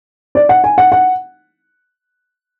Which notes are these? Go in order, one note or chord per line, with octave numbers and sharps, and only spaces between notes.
D5
F#5
G#5
F#5
F#5